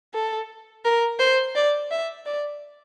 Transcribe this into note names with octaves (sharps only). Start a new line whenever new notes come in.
A4
A#4
C5
D5
E5
D5